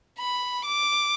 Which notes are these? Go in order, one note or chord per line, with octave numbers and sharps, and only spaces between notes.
B5
D6